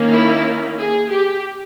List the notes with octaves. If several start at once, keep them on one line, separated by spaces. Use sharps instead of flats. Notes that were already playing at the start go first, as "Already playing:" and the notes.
Already playing: D#3 A#3 C#4
E4
G#4
G4